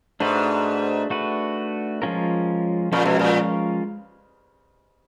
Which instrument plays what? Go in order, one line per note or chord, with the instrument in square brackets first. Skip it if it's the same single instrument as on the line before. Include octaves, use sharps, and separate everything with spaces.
[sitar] G#2 [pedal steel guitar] A3 D4 F#4 B4
[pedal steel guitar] A3 D4 F#4 B4
F3 G#3 C#4 F4 A#4
[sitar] A#2 [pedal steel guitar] F3 G#3 C#4 F4 A#4
[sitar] B2
A#2